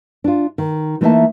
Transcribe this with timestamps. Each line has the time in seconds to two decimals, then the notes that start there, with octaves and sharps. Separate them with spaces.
0.24 D4 F4
0.58 D#3
1.01 E3 A3 A#3 D#4 E5 A5